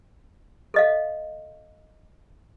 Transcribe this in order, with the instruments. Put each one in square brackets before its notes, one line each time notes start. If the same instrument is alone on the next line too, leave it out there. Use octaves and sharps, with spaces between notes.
[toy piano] A4 D#5 F5